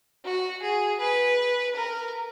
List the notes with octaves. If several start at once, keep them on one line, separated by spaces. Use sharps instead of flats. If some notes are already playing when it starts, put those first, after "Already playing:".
F#4
G#4
B4
A#4